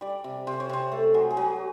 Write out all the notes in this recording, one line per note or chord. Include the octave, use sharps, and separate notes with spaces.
G3 D5
C3
C3 C5
C#5
C3 C5
A3 A4
F#3 G#4
G#4
F#3 G4